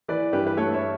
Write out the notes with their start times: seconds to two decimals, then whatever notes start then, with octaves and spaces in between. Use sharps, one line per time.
0.08 E3 B4 D5
0.33 G2 G4 B4
0.47 B4
0.57 A3 A4 C#5
0.74 C#5 E5